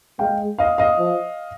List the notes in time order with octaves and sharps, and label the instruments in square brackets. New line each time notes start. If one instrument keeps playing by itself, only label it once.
[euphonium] G#3 [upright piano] F5 G5
[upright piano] D#5 F5
D#5 F5
[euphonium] F3